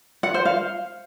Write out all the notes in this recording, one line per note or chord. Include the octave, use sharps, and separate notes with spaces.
F#5
C5
F5